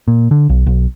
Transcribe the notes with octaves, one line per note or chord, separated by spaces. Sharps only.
A#2
D3
B1
B1